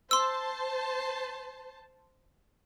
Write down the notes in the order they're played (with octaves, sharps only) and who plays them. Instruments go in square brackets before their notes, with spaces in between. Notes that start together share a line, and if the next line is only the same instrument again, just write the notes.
[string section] C5 A5 [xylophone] C6 E6